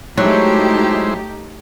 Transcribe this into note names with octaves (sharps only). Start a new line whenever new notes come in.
F#3 G#3 A3 D#4 E4 G4 C5